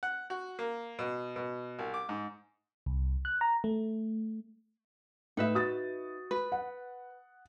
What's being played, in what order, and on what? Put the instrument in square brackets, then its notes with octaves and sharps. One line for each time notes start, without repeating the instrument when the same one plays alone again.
[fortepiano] F#5
F#4
A#3
B2
B2
C2
D6
G#2
[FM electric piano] C2
F#6
A#5
A3
[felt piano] A2 [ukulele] D#4 B4 E5
[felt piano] F#4 D#6 A6
[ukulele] B4
[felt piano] F#5